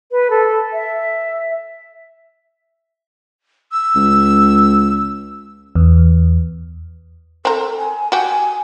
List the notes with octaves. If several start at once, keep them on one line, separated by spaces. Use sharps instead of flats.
B4
A4
E5
E6
C#2
E2
C4 A4 A#4
G#5
F#4 G4 G#5